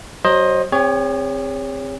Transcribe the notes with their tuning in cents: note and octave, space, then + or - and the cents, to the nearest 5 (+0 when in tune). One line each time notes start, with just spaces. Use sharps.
F#3 +25 C5 +25 D#5 +0
C4 +0 G#4 -45 C#5 +20